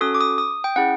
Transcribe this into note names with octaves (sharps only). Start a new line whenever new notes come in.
C#4 F#4 A4 D#6
D6
D#6
D#6
G5
C#4 E4 G#4 F#5